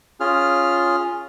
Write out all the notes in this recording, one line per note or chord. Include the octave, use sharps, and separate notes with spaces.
C#4 F4 G#4 F6